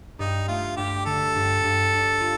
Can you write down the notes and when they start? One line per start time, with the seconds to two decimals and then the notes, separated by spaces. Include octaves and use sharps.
0.19 G2 D#4
0.48 A3 F4
0.77 G2 G4
1.05 D3 A4
1.35 G2
1.63 G2
1.93 D4
2.21 F4